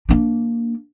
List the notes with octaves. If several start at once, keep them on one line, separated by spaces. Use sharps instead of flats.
A#3 D4